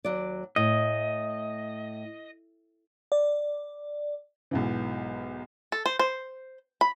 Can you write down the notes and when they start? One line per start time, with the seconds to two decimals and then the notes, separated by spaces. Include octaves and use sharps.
0.05 D#2 F#3 D5
0.56 A2 D#5
3.12 D5
4.51 B1 G#2 E3
5.72 A4
5.86 C5
5.99 C5
6.81 B5